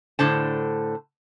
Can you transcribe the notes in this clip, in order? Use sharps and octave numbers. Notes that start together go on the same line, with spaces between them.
A2 D3 C5 A5